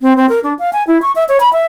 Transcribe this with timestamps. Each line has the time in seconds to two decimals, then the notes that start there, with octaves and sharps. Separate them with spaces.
0.01 C4
0.17 C4
0.29 A#4
0.44 D4
0.59 F5
0.73 G#5
0.87 E4
1.02 C#6
1.16 E5
1.29 C#5
1.40 B5
1.53 E5